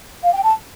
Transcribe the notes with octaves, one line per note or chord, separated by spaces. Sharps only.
F5
G5
A5